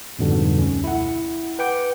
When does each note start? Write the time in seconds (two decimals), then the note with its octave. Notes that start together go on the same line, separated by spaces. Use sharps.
0.19 F2 G#2 B2 D3 G3
0.59 D2 C#4
0.84 E4 F#5
1.59 B4 F#5 G5 D6